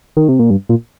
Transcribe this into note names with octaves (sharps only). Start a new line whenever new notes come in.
D#3
C3
A#2
G2
A#2